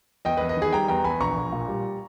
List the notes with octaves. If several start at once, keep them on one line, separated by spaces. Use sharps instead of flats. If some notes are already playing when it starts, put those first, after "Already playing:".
E2 D#5 G5
B4 D#5
E2
B4 D#5
D#3
G#4 B4
G3 G5 A#5
E2 G5 A#5
E2 G#5 B5
A#1 A#5 C#6
A#1
A#2
G3